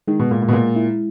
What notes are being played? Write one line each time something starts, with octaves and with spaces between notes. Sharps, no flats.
D#3 G#3
B2
A#2 G#3
A#2
B2
A#2 G#3
E4